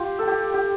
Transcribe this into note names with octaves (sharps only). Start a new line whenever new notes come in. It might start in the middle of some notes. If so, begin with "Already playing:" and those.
Already playing: F4 G4
A4
G4
G4